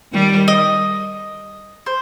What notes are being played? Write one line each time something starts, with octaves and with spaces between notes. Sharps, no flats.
D#3 G3
D#5
C5